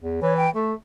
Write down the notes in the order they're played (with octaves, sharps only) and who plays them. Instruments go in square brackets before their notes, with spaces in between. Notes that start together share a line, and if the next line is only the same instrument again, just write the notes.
[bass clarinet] E2
[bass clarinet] E3 [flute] C#5
[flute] G5
[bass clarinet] A3 [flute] A4